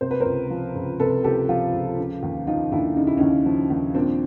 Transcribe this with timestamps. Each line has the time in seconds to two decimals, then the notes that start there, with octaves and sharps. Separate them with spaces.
0.01 C3 C5
0.11 B4
0.20 C#2 A#4 C5
0.50 F3
0.75 C#2
0.99 C3 A4 B4
1.24 C#2 G4 A4
1.49 F3 F4 G4
1.73 C#2
1.98 C#3
2.23 D#2
2.47 F3 D#4 F4
2.72 D#2 D4 E4
2.96 C#3 D#4
3.07 E4
3.17 D#2 C#4 D#4
3.46 F3
3.70 D#2
3.95 A#2 C4 D4